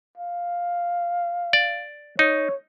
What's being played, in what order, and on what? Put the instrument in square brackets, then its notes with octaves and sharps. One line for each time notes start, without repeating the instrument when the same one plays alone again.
[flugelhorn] F5
[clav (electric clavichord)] D5
[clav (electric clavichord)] D#4 [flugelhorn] C#5